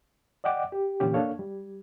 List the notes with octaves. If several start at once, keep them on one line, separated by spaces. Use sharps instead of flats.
D5 D#5 F#5 G5 D6
G4
A#2 D3 E3 C#4 G4
A#3 D4 A4 C#5 F5
G3